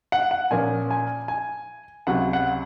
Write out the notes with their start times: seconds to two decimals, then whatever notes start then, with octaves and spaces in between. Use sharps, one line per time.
0.12 F#5
0.31 F#5
0.51 A#2 F3 A#3 C#4 G#5
0.91 G#5
1.28 G#5
2.07 C#2 C3 F#3 F#5
2.33 F#5